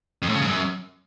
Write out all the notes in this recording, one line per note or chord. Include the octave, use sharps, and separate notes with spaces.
F2
A2
C#3
G#2
F#2